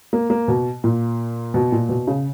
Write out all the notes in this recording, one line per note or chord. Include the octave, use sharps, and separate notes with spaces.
A#3
A#3
B2
A#2
B2
A#2
B2
C#3